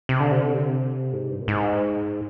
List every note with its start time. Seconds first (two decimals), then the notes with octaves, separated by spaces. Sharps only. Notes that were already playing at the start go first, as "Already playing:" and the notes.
0.09 C3
0.20 D3
0.31 C3
0.43 D3
0.54 C3
1.13 G#2
1.31 G2
1.40 A#2
1.48 G#2